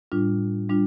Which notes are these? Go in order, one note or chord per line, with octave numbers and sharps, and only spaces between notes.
A2 G3 D4 F4
G3 D4 F4